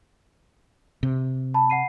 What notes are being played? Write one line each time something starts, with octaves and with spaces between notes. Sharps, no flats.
C3
A5 B5
F#5 C7 D#7